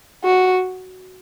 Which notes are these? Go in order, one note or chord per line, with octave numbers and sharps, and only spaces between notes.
F#4